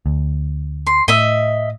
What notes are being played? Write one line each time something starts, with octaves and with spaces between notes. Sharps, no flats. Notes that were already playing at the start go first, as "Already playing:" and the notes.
D2
C6
A2 D#5 E5